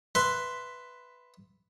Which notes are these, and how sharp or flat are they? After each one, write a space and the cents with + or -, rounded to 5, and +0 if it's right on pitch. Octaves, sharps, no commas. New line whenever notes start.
B4 +0 E5 +5 C6 -5